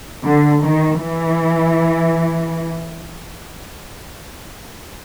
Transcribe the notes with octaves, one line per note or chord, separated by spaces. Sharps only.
D3
D#3
E3